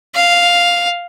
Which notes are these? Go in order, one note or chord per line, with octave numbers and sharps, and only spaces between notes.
F5